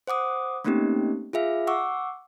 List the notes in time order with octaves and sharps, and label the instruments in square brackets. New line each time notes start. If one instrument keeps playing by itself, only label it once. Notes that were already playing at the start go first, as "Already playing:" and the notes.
[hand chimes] C5 F#5 D6 D#6
A3 A#3 C4 C#4 D#4 G4
F4 G#4 E5 F5
F#5 C#6 D6 E6